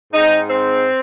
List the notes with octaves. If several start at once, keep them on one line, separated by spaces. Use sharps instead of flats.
G#2 G#3 C4 D#4
C4